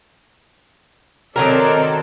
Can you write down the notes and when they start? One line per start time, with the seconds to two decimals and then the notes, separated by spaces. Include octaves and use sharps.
1.36 D#3 F#3 C4 A4 A#4 D5